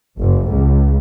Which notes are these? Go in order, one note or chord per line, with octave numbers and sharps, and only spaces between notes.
F#1
C#2